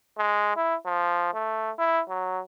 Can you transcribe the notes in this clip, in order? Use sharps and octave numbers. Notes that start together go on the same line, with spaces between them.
G#3
E4
F3
A3
E4
F#3